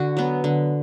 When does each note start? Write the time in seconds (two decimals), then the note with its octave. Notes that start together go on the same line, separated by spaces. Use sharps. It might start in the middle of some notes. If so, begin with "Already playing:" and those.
Already playing: D3 F#4
0.17 F#3 B3
0.44 D3